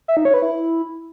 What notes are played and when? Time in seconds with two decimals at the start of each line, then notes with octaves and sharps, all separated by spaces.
0.08 E5
0.17 D#4
0.25 C#5
0.34 B4
0.42 E4